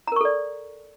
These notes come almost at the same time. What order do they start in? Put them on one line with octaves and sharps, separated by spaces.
A#5 A#4 C#6 A4 D5